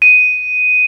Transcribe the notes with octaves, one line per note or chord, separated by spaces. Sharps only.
D#7